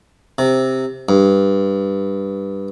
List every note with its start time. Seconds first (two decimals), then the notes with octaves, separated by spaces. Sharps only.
0.38 C3
1.09 G2